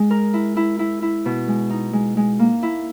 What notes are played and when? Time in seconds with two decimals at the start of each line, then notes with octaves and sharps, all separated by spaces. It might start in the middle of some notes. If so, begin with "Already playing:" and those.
Already playing: G#3
0.11 A#4
0.34 E4
0.57 E4
0.79 E4
1.02 E4
1.25 B2
1.48 G#3
1.70 D#4
1.93 G#3
2.17 G#3
2.39 A#3
2.63 E4